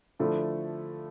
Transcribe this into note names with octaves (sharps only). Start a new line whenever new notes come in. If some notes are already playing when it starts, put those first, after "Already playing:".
D3 F3 A3 E4 A4